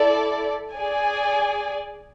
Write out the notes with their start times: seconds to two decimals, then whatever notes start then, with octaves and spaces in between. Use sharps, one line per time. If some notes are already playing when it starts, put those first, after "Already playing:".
Already playing: E4 A4 D5
0.73 G#4 D5 G#5